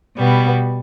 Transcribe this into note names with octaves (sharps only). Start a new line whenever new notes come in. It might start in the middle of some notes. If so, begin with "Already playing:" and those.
B2 G3 B3